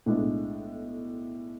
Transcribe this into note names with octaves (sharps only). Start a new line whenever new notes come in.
B1 A2 G#3 D4